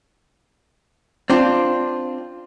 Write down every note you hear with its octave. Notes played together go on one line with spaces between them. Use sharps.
C4 D4 F4